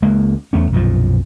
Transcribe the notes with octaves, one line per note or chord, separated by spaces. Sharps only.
C#2 G#3 A#3
E2 A3 C#4
B1 F#2 A#2 F3